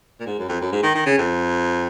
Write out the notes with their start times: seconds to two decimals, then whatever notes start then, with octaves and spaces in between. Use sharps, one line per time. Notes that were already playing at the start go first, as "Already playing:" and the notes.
0.20 A#2
0.26 G#2
0.39 F#2
0.49 F2
0.61 F#2
0.72 G#2
0.83 D#3
0.95 D#3
1.06 C#3
1.18 F2